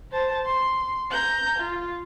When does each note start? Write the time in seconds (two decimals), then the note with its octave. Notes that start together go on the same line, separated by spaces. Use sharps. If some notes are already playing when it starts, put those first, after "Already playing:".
0.12 C5 A5
0.46 C6
1.11 A#5 G6
1.59 F4